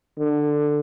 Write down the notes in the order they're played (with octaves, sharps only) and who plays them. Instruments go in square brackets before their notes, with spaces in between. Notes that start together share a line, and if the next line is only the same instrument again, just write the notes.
[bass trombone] D3